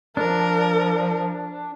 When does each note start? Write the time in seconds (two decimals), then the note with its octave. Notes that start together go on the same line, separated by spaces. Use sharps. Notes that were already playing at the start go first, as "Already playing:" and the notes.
0.17 F3 D4 A#4